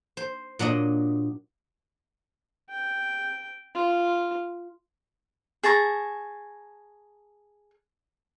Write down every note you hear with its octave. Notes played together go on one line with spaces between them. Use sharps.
C5
A#2 F#3 D4 D#5
G5
F4
G#4 A5 A#5 C#6